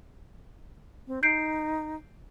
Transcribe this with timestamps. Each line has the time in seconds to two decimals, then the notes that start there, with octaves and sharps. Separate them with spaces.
1.07 C4
1.23 D#4 G6 C7 D7